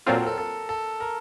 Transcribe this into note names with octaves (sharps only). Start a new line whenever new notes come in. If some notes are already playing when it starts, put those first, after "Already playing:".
A#2 F#3 C4 F4 A4
A#4
A4
A4
A4
A#4